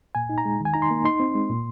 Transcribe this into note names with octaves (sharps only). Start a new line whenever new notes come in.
A#2 G#5
D#4
A#5
G#3
D#3 G#5
D#4 A#5
C6
A#3
D#4 C6
C4
G#3
A#2